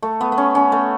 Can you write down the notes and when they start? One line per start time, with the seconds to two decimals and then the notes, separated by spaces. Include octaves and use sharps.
0.02 A3
0.21 B3
0.32 B3
0.38 C#4
0.55 C#4
0.72 A3